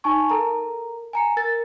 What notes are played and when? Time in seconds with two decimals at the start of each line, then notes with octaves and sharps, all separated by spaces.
0.04 D#4 G#5 A5 C#6
0.29 A4 A#4 A#5
1.13 G#5 A#5 C#7
1.37 A#4 A6